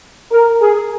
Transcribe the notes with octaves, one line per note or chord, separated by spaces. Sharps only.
A#4
G#4